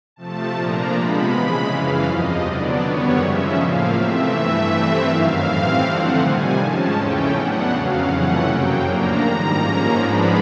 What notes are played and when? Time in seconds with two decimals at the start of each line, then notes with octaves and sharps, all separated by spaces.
0.16 C3 F3 A3 A5
0.55 A#2 F3 A#3 D4 A#5
0.91 C3 F3 G#3 B3 B5
1.29 C#3 E3 G#3
1.67 F#2 C#3 E3 F5
2.04 E2 C3 F3 D#5
2.42 D3 F#3 B3 D4 D5
2.80 F#2 D#3 G3 B3 C#5
3.17 C#3 F3 G#3 C#4 E5
3.55 A2 F3 A#3 F5
3.93 C3 E3 A3 C4 E5
4.31 G2 E3 A3
4.68 G2 E3 A3 C4
5.05 F#2 D#3 F#3 F5
5.43 A2 E3 G3 C4
5.80 D3 F3 A3 C4 F#5
6.18 C3 D#3 G3 G#5
6.56 G#2 F3 G#3 C#4 A5
6.94 E2 C#3 E3 A3 C#4 G5
7.31 A2 F#3 B3 D4 F#5
7.69 F2 C#3 F#3 F5
8.06 F2 C3 E3 A3 C#4 F#5
8.44 F#2 C#3 F#3 A#3 G5
8.82 A2 F3 A#3 D4 A#5
9.20 G#2 D#3 G3
9.57 G#2 F3 A#3 C#4
9.94 G#2 F3 G#3 B3 D4 B5